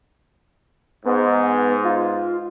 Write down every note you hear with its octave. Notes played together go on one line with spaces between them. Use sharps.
G#2 B3
F4